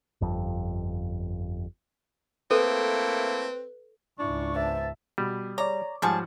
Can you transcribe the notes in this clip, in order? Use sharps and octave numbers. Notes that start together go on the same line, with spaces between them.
G1 F2
A3 A#3 C4 E4 A4 B4
C#2 G#2 D4 E4 C#6
B3 C5 E5 A5
B2 G3
C#5 D5 A#5 D6
G#2 F3 G3 G#4 F#5 A5 C#6